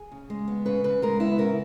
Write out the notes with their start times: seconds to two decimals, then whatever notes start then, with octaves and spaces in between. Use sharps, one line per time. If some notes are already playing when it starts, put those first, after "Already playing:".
Already playing: G#4
0.12 C#3
0.30 G#3
0.48 B3
0.66 C#3 B4
0.84 C#3 B4
1.02 G#3 A#4
1.20 B3 E4
1.38 C#3 A#4